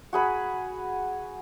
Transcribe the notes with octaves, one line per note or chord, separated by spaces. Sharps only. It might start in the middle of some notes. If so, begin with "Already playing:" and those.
F#4 G#4 B5